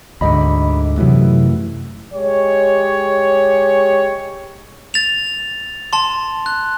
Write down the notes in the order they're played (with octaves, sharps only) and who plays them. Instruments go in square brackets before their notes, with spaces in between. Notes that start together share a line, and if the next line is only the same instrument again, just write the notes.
[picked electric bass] D2 G#2 D3 [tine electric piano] D#5 B5
[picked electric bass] F#2 E3 [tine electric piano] C3 F#3 A3
[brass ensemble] G#3 G4 C#5
[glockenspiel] A6 F7
A5 C6
F#6